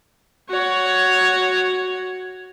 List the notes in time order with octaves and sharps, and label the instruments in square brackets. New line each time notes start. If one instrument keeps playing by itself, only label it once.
[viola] F#4 C#5